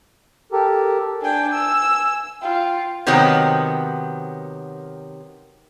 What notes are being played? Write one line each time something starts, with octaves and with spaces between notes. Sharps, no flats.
G4 A4 A#4
D4 G5 G#5
E6
F4 G5
C3 D#3 F#3 B3 C4